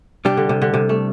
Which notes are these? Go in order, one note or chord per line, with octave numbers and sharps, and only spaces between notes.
C3 G3 D4 G4
D3
C3
D3
C3
A3